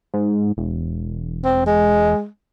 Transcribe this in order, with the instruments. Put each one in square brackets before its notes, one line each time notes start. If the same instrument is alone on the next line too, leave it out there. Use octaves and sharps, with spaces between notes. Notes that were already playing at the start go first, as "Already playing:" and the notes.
[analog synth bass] G#2
E1
[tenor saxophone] C4
G#3